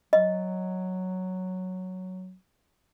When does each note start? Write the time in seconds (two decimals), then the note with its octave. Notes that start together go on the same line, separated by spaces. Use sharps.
0.13 F#3 D#5